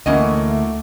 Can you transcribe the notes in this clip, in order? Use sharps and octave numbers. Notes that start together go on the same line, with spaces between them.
D2 E3 A3 A#3 C#4 E4 D#5 F#5